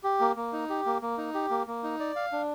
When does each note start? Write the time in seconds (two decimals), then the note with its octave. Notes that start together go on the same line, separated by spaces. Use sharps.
0.04 G4
0.20 A#3
0.36 A#3
0.53 D#4
0.70 G4
0.86 A#3
1.02 A#3
1.18 D#4
1.34 G4
1.50 A#3
1.67 A#3
1.83 D#4
2.00 D5
2.16 F5
2.32 D4